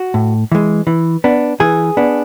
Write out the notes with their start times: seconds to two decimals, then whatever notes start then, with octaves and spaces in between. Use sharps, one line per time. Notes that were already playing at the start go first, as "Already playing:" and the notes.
Already playing: F#4
0.14 A2
0.52 E3 G#3
0.87 E3
1.24 B3 D4
1.60 E3 G#4
1.97 B3 D4